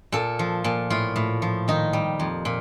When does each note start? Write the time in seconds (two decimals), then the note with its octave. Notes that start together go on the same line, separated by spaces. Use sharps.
0.12 A#2 A4
0.39 F3
0.64 A#2
0.90 A2 F4
1.16 A2
1.42 F3
1.68 D#3 D#4
1.93 G3
2.20 F2
2.45 A#2